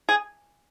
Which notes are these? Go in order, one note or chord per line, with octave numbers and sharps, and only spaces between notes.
G#4